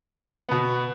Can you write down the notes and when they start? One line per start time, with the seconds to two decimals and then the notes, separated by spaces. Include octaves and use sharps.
0.49 B2 B3